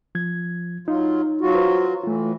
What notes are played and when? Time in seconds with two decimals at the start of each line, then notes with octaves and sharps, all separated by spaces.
0.15 F3 G#6
0.88 F#3 D#4 F4
1.41 F#3 F4 F#4
1.54 B4 C5
2.04 A2 E3 A3 F4